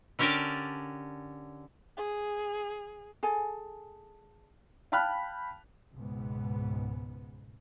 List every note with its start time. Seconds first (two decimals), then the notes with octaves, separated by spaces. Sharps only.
0.19 D3 C#4 G4 A#4 D5 A5
1.97 G#4
3.23 G#4 A4 G#5
4.92 F5 G5 A5 B5 F6 F#6
5.95 C#2 G#2 B2 B3